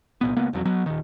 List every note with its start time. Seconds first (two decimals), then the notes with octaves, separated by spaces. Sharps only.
0.21 C2 A#2 B3
0.37 C#2 A#3 B3
0.53 E1 F2 F#3
0.65 F#3 B3
0.86 D#1 D#3